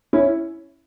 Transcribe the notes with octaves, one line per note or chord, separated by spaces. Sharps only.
C#4 E4